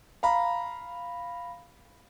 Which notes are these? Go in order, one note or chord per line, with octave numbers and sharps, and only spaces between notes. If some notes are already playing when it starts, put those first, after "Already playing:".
F5 A#5 B5